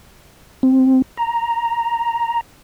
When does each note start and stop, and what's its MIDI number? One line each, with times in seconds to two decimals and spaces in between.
0.63 1.02 60
1.17 2.41 82